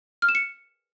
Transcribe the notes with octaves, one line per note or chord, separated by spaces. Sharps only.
F6
E7
C#7